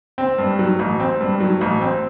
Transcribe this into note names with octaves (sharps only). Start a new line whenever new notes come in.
C4
G2
F#3
A1
C4
G2
F#3
A1
C4